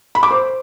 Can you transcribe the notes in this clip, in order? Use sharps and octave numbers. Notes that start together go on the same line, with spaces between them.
B5
D6
C5